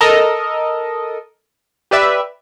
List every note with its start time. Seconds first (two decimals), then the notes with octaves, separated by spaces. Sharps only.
0.01 A4 A#4 D#5
1.91 G4 B4 D5 E5